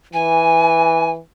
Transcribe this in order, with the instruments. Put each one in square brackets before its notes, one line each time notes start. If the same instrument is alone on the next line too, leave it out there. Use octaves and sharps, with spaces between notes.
[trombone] E3 [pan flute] G#5